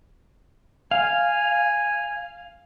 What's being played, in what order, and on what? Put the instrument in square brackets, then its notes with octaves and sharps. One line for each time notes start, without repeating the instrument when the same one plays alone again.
[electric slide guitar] F5 [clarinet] G#5